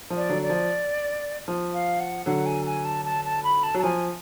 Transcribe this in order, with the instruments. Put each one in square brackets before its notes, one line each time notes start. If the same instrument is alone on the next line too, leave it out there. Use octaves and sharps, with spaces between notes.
[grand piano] F3
[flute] D5
[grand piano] D3 F#3
[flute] D5
[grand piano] F3
F3
[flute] F5
F#5
[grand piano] D3 F#3 [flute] F#5
[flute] G#5
G#5
A5
A5
A5
B5
A5
[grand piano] F#3
[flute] A5
[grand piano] F3 [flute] G#5